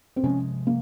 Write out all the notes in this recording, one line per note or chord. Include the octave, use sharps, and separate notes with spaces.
C4
C3 F3 G#3 C#4
A#3